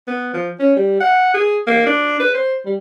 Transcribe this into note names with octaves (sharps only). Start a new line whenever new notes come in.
B3
F3
C#4
G3
F#5
G#4
A#3
D4
B4
C5
G3